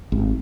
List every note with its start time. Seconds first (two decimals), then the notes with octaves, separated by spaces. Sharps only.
0.12 G#1